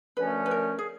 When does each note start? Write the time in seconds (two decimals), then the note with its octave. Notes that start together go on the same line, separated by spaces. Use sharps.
0.17 F#2 D3 F3 A3 C#4 B4
0.46 B4
0.51 A#4
0.79 G#4